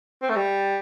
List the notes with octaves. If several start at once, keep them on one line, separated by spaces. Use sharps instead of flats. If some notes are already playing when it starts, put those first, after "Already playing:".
C4
A3
G3